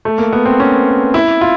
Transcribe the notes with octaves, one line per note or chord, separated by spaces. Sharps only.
A3
A#3
B3
C4
C#4
E4
F4